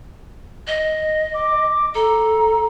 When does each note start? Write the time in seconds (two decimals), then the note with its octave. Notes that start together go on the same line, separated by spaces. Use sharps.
0.67 D#5
1.34 D6
1.95 A4 A#5